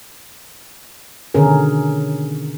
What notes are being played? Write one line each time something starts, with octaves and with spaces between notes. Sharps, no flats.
B2 D3 D#3 C#4 G#4 A#4